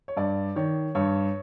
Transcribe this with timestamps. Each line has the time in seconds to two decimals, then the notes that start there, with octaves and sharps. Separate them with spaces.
0.08 C#5
0.17 G2 D5
0.56 D#3 C#5
0.95 G2 C#5